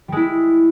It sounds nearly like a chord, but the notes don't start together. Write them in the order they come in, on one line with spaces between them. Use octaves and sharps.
G3 G#3 E4